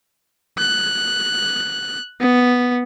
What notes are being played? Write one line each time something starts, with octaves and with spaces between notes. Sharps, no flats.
F#6
B3